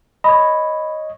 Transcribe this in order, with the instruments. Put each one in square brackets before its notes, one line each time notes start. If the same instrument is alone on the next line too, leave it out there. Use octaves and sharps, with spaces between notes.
[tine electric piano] C#5 D#5 [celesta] B5